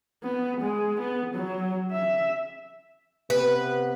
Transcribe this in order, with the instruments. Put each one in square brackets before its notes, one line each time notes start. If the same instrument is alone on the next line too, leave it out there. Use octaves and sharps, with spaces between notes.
[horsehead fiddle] B3
G#3
B3
F#3
E5
[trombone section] C3 B3 [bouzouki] B4